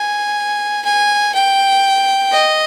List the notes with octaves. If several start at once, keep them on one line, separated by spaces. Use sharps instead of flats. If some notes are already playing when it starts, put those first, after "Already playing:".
Already playing: G#5
G#5
G5
D#5